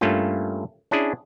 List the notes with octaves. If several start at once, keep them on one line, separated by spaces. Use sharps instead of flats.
G2 A3 A#3 C#4 F4
C#4 D4 E4 G#4